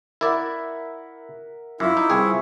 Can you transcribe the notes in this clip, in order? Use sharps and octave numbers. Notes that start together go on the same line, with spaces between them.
E4 A#4 D5 E5 F#5
F#2 E4 F4 D6
D#4
C2 C4 G#4 B4 C#6